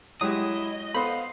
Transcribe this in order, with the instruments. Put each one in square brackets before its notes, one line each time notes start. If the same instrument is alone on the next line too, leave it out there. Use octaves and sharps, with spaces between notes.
[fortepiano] F#3 G#3 G4 [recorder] E4 [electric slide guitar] D#5 [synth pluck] D#6
[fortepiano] B3 A4 C5 [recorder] F5 [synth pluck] B5